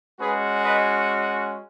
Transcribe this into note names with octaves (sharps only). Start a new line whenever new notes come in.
G#3 C#4 F#4 G#4 B4
B4 D#5